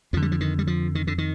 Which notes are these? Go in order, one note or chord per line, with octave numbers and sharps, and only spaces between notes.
F2 D3 F3
G3
F3
D#3
G3
F3
D#3
D3
D#3